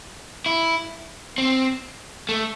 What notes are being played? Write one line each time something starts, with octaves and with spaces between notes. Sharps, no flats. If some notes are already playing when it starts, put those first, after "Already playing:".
E4
C4
A3